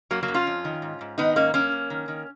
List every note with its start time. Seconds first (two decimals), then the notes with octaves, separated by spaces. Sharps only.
0.11 F#2 F#3 A#3
0.23 F#3 A#3
0.28 F#2
0.34 C#4 F4
0.47 F2
0.65 D#3
0.82 G#2
1.01 G#2
1.18 D#3 B3 D#4
1.36 G#2 A#3 C#4
1.54 F#2 A#3 C#4
1.72 F#2
1.90 D#3
2.08 D#3